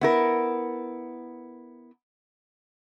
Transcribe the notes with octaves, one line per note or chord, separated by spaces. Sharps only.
B3 E4 A#4